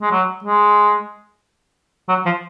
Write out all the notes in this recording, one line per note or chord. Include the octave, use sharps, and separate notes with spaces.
G#3
F#3
G#3
F#3
F3